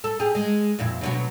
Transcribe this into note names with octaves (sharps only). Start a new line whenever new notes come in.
A4
G4 G#4
G#3
F2 A#2 E4
D2 B2 F#3